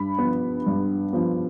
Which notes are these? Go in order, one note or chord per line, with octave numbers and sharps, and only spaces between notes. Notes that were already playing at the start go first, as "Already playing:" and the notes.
Already playing: G2 B5
F3 B3
G2
F3 B3